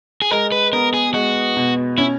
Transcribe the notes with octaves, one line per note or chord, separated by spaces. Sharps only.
G#4
G#3 A#4
B4
B3 A#4
G#4
G#3 F#4
B2
C#4 E4